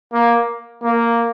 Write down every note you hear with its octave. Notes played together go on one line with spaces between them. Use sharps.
A#3
A#3